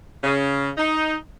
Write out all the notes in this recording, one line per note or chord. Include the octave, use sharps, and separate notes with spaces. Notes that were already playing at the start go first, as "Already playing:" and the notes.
C#3
D#4